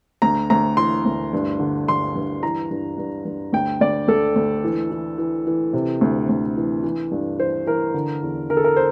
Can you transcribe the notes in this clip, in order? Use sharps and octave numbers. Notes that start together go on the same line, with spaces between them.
D2 A#5
D2 A#5
E3 C6
D2
G2
D3
G2 C6
G2
E3 A#5
G2
G2
G2
D2 G5
D2 D5
D2 A4
D2
E3
E3
E3
E3
C3
D2
D2
E3
E3
G2
E3 C5
E3 A#4
D3
E2
D3 A#4
A4
A#4
C5